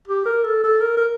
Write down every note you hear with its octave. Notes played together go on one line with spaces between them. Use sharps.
G4
A#4
A4
A4
A#4
A#4